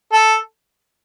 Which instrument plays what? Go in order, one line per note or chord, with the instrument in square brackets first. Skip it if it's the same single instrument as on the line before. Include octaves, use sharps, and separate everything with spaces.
[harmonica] A4